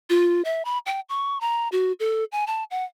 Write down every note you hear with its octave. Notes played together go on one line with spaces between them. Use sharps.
F4
E5
B5
G5
C#6
A#5
F#4
A4
G#5
A5
F#5